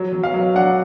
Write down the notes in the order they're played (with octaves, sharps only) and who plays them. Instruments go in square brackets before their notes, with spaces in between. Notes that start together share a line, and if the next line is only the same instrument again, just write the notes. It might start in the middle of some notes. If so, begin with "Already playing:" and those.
Already playing: [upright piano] F#3
F#3
F5
F#3
D4 F#5